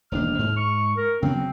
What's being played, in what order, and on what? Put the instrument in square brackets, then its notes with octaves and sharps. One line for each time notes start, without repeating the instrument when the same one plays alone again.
[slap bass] E1 D#2 D4 [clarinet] F6
[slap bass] G#2
[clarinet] C#6
A#4
[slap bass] C#3 F#3 B3 [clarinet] C4